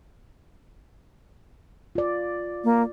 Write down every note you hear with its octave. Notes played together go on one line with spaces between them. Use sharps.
F4 D5
A#3